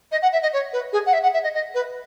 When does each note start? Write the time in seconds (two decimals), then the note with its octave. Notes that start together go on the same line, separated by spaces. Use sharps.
0.11 D#5
0.22 F#5
0.32 E5
0.42 D#5
0.52 C#5
0.72 B4
0.92 G#4
1.06 F#5
1.13 E5
1.22 F#5
1.33 E5
1.43 D#5
1.54 D#5
1.74 B4